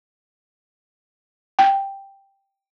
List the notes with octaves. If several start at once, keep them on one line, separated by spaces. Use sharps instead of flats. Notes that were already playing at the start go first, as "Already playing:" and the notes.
G5